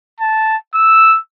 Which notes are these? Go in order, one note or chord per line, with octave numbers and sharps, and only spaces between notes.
A5
E6